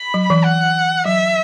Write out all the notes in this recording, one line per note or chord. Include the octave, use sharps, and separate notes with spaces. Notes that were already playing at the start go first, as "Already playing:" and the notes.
Already playing: B5
F#3
E3
F#5
F#3 E5